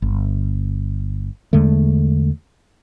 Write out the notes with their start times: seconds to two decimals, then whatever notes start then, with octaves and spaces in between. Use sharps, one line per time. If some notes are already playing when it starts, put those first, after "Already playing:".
0.02 G1
1.53 E2 D3 G#3 A3